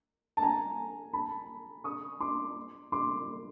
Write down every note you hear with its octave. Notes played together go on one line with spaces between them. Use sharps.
A5
G#5 A#5
A5 B5
C#6 D#6
C6 D6
C6 D6